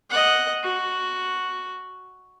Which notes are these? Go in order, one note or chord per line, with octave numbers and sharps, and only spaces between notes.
D#5 F#5
F#4